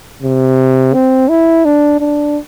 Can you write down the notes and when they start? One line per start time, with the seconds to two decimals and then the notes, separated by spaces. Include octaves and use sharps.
0.23 C3
0.94 C4
1.29 E4
1.65 D4
2.01 D4